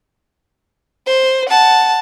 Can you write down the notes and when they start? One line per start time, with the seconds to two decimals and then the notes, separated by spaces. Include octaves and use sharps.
1.07 C5
1.49 F#5 A5